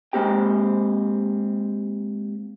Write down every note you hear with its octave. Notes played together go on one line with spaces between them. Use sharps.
G#3 A#3 C4 G4 G5